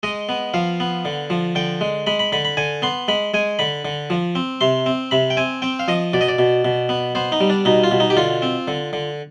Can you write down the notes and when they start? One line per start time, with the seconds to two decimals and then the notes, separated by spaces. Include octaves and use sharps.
0.03 G#3 D#5
0.29 B3
0.54 F3 F5
0.80 B3
1.05 D3
1.30 F3
1.55 D3 G5
1.81 G#3
2.07 G#3 B5
2.19 B5
2.32 D3 B5
2.45 B5
2.57 D3 G#5
2.82 B3 C6
3.08 G#3 B5
3.34 G#3 G#5
3.59 D3 B5
3.85 D3
4.10 F3
4.35 C4
4.61 C3 C6
4.86 C4
5.11 C3 B5
5.30 G5
5.37 C4 G#5
5.62 C4 G5
5.79 F5
5.88 F3 D#5
6.13 B2 D5
6.21 D#5
6.28 D5
6.39 B2
6.65 B2
6.89 B3
7.15 B3 C5
7.32 D#4
7.41 G3
7.50 D4
7.65 B2 D#4
7.83 F4
7.91 B2
8.00 D#4
8.10 G4
8.17 D3 F4
8.42 C4
8.68 D3
8.93 D3